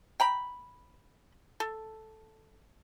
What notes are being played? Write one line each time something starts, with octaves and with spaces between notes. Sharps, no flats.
G5 A#5 B5
A4